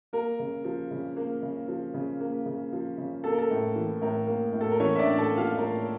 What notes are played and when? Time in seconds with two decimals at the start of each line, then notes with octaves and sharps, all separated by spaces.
0.13 A#3 A#4
0.39 C#3
0.64 F3
0.91 C#3
1.17 A#3
1.42 C#3
1.68 F3
1.94 C#3
2.20 A#3
2.46 C#3
2.73 F3
2.98 C#3
3.24 A#3 A4
3.32 A#4
3.39 A4
3.51 A2
3.75 E3
4.02 A2 A#4
4.27 A#3
4.53 A2
4.61 A4
4.71 A#4
4.80 E3 C#4 C#5
4.95 E5
4.99 D4 D5
5.05 A2
5.18 A4 A5
5.31 A#3
5.38 F4 F5
5.58 A2 A#4